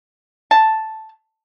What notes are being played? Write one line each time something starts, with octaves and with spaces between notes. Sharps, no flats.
A5